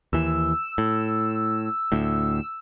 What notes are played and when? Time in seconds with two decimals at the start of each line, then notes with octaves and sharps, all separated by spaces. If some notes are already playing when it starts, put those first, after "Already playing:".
0.13 D#2 E3 E6
0.78 A2
1.92 D2 A2